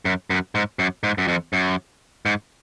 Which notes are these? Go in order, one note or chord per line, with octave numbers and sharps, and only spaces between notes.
F#2
F#2
G#2
F#2
G#2
F#2
F2
F#2
G#2